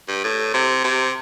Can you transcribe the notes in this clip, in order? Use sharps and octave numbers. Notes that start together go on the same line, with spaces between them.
G2
A2
C3
C3